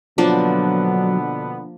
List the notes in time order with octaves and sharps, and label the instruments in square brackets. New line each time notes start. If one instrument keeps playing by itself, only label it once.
[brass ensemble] B2 D3 B3 [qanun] F3 A#3 D4 [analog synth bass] F#3